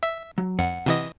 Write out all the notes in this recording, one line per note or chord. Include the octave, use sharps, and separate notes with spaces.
E5
F#3
F2 F#5
C3 E3 D#5